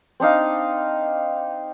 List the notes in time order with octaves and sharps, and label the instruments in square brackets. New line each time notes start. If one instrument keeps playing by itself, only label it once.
[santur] C4 D4 D#4 F5